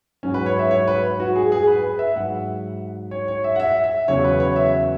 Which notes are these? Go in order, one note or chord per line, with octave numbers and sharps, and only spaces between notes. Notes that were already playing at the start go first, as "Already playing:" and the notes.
G#2 F#3 C#4
B4
C#5
E5
C#5
B4
F#4
G#4
G#4
B4
B4
E5
G#2 F#3 F#5
C#5
C#5
E5
F#5
E5
E5
E2 C#3 F#3 C#5
B4
C#5
E5